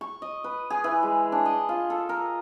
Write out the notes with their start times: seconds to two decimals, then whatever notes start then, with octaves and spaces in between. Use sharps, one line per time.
0.01 C#6
0.22 D#5
0.44 B4
0.70 G#4
0.84 E3
1.03 G#3
1.32 D4
1.46 D#5
1.69 F4
1.90 A4
2.09 A#4